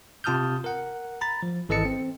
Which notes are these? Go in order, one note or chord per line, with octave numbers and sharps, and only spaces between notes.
C3 F4 A5 D#6 F6 G6
A#4 F#5
A#5 B5 A6
F3
G#1 E3 A4 D#5 A5 C#7
C4